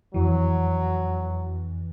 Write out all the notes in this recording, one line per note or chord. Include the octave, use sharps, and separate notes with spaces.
F2 E3 F#3